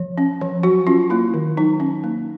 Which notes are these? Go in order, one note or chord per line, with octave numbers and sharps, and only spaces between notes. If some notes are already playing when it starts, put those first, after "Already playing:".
Already playing: F3
C#4
F3
F#3 F#4
C#4 F4
A#3 E4
D#3
F#3 D#4
C#4
A#3